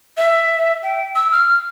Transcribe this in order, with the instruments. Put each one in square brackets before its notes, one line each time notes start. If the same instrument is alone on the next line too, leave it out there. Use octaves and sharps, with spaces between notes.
[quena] E5
G5
E6
F6